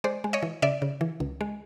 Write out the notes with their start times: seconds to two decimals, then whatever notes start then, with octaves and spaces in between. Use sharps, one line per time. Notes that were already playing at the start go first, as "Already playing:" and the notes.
0.04 G#3 C5 D5
0.24 G#3
0.33 C#5 D#5
0.43 E3
0.62 C#3 D5 E5
0.82 C#3
1.01 E3
1.20 C#2
1.41 G#3